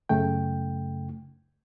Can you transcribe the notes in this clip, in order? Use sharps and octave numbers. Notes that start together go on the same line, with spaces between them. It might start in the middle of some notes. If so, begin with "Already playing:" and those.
F#2 C#3 A3 G5